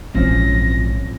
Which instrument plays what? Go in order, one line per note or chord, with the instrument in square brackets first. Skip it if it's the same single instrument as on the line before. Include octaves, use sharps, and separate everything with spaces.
[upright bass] A#1 G#3 [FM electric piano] G#2 E3 C#4 [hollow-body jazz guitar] F3 C4 [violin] A#6